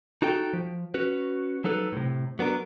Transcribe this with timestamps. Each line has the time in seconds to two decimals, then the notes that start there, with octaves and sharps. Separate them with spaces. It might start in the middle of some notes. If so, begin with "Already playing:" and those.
0.22 D#4 F#4 A4 G5
0.53 F3
0.94 C#4 F#4 B4
1.64 F3 F#3 D#4 A4 B4
1.92 A2 C3
2.39 F#3 B3 D4 A#4